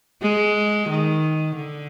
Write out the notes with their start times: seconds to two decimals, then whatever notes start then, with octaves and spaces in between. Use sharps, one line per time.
0.22 G#3
0.89 D#3
1.56 D3